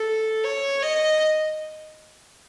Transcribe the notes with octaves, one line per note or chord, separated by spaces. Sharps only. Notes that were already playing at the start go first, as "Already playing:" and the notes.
Already playing: A4
C#5
D#5